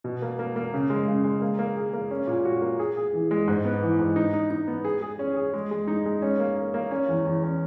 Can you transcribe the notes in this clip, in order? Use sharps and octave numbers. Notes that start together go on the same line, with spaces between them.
B2
A#3
A#3
A#3
C#3
G#3
C#3
G#3
A#3
A#3
G#4
A#3
C#4
A#2
F#4
A#3
G#4
G#4
E3
G#3
G#2
B3
E3
G#2
D#4
D#4
D#4
B3
G#4
G#4
C#4
G#4
G#3
G#3
D#4
G#3
C#4
A#3
A#3
A#3
C#4
E2
E2
C#4